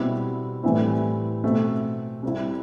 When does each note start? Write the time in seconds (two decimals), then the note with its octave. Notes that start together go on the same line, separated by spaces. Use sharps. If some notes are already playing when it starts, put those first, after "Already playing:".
Already playing: B2 G3 C4 E4
0.63 A2 E3 G3 C4 E4
1.44 B2 A3 C4
2.23 C3 G3 C4 E4